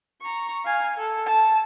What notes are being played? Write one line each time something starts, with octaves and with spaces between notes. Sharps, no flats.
A#5 C#6
F5 G#5
A4
A5